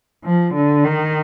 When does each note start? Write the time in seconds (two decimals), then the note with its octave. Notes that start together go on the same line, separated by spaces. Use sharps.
0.24 F3
0.54 D3
0.84 D#3